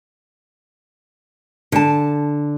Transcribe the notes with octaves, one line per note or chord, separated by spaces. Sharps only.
D3 A5